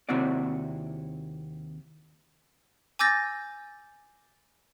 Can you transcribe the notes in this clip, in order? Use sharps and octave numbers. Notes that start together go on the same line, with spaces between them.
D#2 C3 C4 E4 F#4 D5
G#5 D6 E6 G6 A6 A#6